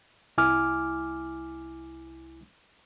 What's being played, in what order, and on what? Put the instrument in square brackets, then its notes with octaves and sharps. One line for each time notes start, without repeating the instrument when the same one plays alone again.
[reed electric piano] C2 E4 G#5 D6 F6